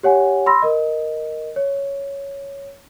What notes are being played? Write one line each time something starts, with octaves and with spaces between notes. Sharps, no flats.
G4 C#5 F#5 G#5
B5 C6 E6 A#6
A#4 D#5
C#5